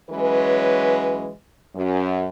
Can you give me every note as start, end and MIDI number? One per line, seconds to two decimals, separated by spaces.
0.11 1.29 52
0.11 1.29 54
0.11 1.29 56
0.11 1.29 61
0.11 1.29 71
1.75 2.29 42